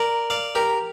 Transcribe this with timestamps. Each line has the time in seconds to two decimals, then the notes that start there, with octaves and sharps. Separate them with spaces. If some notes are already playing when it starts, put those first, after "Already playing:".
Already playing: A#4 D5
0.30 D5 F5
0.55 G4 A#4